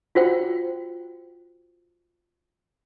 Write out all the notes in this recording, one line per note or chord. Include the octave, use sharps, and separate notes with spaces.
F4 F#4 C5 G5